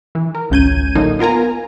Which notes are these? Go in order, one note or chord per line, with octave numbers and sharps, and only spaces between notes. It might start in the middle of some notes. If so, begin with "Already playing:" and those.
E3
A#4
G#1 C#2 C#4 G6 G#6 D#7
A2 D3 F#3 A#3 D#4
B3 F4 A#4 G#5 A#5